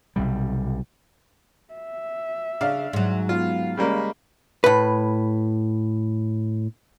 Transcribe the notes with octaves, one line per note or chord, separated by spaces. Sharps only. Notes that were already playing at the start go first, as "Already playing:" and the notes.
B1 C3 G3
E5
C#3 D4 F5
G#2 F#3
B3 F4 F5
C#3 G3 G#3 A#3 B5
A2 B4